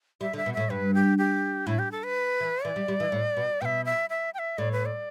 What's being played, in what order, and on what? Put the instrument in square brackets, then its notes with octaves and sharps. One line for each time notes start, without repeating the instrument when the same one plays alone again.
[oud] G3 [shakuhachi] E5
[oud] D3
[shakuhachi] E5
[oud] B2
[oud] A2 [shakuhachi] E5
[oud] G2 [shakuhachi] B4
[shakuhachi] G4
G4
[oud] A2 [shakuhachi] E4
[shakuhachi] G4
A4
B4
[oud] E3
[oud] E3 [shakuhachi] D5
[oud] G3
G3
E3
A2
B2
[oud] B2 [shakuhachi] E5 G5
[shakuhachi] E5
E5
G5
E5
[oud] A2 [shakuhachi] D5
[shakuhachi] B4
D5